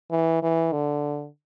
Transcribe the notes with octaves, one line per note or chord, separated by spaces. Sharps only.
E3
E3
D3